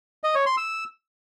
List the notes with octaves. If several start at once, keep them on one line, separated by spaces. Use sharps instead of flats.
D#5
C#5
C6
E6